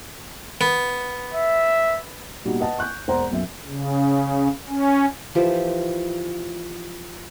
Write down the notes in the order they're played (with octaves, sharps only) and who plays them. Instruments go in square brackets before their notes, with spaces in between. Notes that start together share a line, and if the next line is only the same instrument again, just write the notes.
[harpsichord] B3
[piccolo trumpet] E5
[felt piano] A#2 G3 B3 D#4 F#4
B4 D#5 F#5 A5
C#6 F#6 G6
E1 C5 D5 F#5 A#5 C6
B1 F#2 E5
[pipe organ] C#3
C#4
[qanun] E3 F3 G4 A4